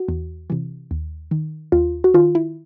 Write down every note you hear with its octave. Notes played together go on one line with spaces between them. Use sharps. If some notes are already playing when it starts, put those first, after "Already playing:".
Already playing: F#4
E2
C3 E3
D#2
D#3
D#2 F4
F#4
D#3 F4
E4